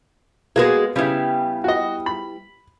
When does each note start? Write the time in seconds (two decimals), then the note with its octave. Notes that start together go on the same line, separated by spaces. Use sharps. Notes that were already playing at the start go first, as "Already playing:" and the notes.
0.56 G#3 A#3 B3 F#4 G#4
0.96 C#3 G3 B3 E4
1.64 F#4 D#5
2.06 B5